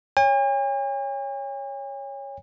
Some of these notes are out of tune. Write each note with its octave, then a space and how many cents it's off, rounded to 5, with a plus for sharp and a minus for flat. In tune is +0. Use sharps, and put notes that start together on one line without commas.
C#5 +0 G#5 -45